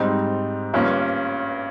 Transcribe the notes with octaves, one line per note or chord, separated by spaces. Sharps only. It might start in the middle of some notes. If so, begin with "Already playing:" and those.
Already playing: G#2 G3 C4 D#4
G1 G2 F3 A#3 C#4